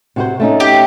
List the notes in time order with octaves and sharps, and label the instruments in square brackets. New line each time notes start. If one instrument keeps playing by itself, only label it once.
[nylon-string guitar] C3 F#4 C5
A3 C#4 D#4
[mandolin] G4